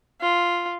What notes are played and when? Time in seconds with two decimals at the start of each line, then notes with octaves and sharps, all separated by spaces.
0.21 F4